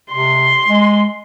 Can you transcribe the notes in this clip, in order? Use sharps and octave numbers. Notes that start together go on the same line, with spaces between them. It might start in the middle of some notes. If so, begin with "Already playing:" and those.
C3 C6
G#3